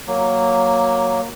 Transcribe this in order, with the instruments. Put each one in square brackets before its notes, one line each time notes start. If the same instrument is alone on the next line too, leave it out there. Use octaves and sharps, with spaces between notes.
[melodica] F#3 A#3